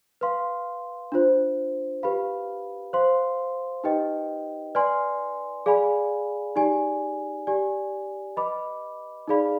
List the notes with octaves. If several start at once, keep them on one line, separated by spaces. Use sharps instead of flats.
B4 F5 C6
D4 F4 C5
G4 B4 F5 B5
C5 F5 C6
D#4 G4 B4 D#5 G5
B4 D5 G#5 C6
G#4 D5 F5 G#5 B5
D#4 G4 D5 G#5
G4 D5 G#5
B4 D#5 B5 D6
D#4 G#4 D5 F5 B5